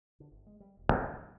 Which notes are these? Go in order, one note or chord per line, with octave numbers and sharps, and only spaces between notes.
D3
G1
G#3
G3
E1
F#2
D#3
G3